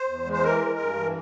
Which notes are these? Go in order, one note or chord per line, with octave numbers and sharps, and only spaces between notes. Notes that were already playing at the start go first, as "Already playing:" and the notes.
Already playing: C5
E2
G#3
C5
E3 A#4
G#3
G2
E3